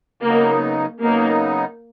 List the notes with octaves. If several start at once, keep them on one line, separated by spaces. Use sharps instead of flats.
C#3 F#3 A#3 B3 D#4
C#3 F#3 A#3 B3 D#4